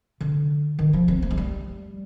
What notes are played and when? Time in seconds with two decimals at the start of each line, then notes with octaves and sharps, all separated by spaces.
0.21 D3
0.79 D#3
0.93 F3
1.08 C4
1.22 A#3
1.31 G#3
1.37 G3